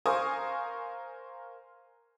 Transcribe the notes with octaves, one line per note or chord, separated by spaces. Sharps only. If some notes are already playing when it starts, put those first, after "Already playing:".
A#4 C5 F5 G#5 C#6 D#6